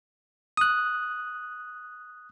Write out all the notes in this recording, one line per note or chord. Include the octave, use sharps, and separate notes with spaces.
D#6 F#6